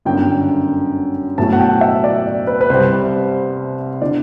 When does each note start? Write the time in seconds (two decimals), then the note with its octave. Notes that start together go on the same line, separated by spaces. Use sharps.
0.05 G1 F#2 D3 G5
1.38 B1 A2 F#3 A3 A5
1.53 F#5
1.59 G5
1.81 E5
2.04 D5
2.47 B4
2.61 B4
2.70 C2 C3 G3 C5
4.02 D3 D5